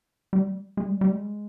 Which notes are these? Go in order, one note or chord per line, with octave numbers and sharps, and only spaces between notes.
G3
G#3
G3
G3
G#3